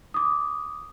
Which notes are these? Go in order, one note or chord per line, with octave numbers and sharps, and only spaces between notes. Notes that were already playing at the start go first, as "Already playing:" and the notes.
D6 D#6